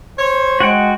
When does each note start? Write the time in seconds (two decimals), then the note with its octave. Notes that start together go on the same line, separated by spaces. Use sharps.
0.19 C5 C#5
0.60 G#3 F#4 F#5 G5